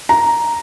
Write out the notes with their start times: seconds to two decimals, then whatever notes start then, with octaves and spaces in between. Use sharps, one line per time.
0.09 A#5